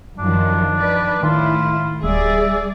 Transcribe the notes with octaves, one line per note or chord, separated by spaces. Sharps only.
F#2 D#3 F3 D4
D#3 B4 D5
A2 D#3 E4 F4
D1 G3 G#4 D5 E5